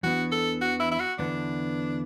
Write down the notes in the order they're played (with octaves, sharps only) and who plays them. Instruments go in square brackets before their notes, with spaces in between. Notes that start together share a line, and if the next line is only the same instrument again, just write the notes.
[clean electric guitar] E2 E3 B3 D4 [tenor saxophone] F#4
[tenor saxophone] A4
F#4
E4
E4
F#4
[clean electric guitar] E2 D3 B3 E4 [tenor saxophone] D4